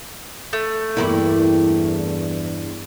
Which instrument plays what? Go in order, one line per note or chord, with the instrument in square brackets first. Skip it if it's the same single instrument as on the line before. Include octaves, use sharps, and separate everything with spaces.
[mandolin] A3
[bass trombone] E2 [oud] G2 A#3 E4